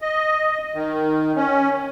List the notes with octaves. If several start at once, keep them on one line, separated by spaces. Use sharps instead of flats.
D#5
D#3
C#4